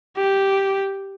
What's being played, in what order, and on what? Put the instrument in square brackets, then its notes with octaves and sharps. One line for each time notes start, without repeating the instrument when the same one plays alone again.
[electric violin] G4